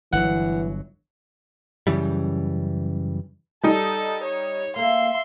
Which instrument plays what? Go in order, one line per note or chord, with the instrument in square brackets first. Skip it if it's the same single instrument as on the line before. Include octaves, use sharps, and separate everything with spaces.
[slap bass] G1 F#3 [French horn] E3 [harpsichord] F#5
[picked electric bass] F#2 C#3 E3 G3
[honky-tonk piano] G3 D#4 [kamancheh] A4
[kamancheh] C#5
[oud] A#3 A4 [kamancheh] E5 C6